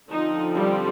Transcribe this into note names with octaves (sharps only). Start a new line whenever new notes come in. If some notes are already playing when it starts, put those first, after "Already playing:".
D3 F3 C4 D#4
G3 G4